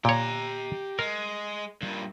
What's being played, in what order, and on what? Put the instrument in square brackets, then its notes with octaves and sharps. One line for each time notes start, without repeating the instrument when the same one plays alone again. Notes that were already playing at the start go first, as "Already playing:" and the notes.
[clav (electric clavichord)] A#2 C#5 [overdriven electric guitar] G4 A#5
[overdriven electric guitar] G#3 [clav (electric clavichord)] A#4
[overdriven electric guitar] G2 A#2